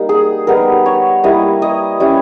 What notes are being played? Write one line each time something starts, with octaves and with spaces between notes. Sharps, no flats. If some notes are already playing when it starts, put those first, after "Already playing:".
Already playing: G3 A#3 D#4
G#4
G3 B3 D#4 A#4
C#5
G3 A#3 E4 D#5
D#5
G3 C#4 E4